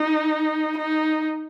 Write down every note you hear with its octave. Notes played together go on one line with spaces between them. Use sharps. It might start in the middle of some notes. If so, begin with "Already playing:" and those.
Already playing: D#4
D#4